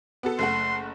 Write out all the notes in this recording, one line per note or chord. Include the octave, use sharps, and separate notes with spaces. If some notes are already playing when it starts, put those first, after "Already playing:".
B3 F#4 A4
F#1 A3 F#5 C6